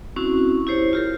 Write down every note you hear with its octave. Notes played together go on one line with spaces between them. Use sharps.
C4 C#4 E4 F#4
E4 G4 C5 C#5
F4 G4 A#4